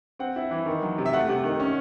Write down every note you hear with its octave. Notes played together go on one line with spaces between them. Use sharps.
C4 F#5
E4
E3
D#3
F#3
C3
E5
A3 F#5
C3
D#3
C#4